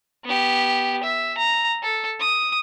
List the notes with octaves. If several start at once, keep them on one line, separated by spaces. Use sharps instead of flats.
B3 G4
E5
A#5
A4
D#6